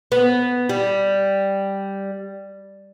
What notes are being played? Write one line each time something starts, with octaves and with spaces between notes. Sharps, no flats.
B3
G3